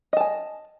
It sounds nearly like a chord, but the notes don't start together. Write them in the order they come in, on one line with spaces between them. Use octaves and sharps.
D#5 A5 G#5